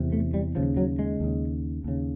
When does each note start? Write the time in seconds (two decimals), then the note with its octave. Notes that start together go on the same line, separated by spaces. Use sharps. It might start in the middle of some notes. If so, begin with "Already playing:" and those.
Already playing: E2 C3
0.12 A3
0.34 G3
0.55 D#2 C#3 F3
0.77 F#3
0.99 G#3
1.20 D#2 C#3
1.84 D#2 C#3